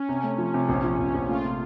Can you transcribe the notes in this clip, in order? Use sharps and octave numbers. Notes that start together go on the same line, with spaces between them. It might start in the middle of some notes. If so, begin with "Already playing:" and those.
Already playing: C#4
C3
A3
F3
C3
A#1
F3
A#1
A#1
A3 F4
C3